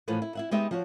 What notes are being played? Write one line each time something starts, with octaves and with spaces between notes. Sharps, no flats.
A2 E3 F3 B4 F#5
E4
E4 E5 F#5
G#3 B3 D#4 G4 D#5 E5
F3 F#4 C#5